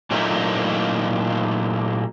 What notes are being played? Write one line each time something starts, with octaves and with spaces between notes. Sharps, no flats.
A#2 F#3 A3 A#3 D#4 E4